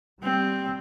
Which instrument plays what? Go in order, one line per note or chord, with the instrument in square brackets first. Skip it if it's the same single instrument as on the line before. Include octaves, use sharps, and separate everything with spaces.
[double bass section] G3 [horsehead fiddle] C4